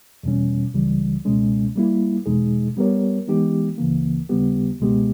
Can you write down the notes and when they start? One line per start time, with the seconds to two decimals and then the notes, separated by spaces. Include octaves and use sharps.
0.23 E2 B2 G3 C#4
0.74 C#2 C#3 E3 G3
1.25 C#2 B2 G#3 C#4
1.76 G3 A#3 E4
2.26 E2 B2 G#3 D#4 G#4
2.77 G3 B3 G4 A#4 C#5
3.27 E3 G#3 B3 D#4 G4
3.78 C#2 C#3 E3 A#3
4.29 D#2 C#3 G3 B3 G4
4.80 C#2 B2 G#3 B3 G4